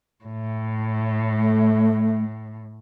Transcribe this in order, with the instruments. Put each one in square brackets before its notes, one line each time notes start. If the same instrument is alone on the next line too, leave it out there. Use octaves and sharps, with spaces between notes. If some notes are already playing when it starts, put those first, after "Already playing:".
[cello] A2
[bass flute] A3